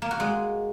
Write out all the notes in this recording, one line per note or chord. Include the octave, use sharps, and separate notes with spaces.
A#3
F#4
G#3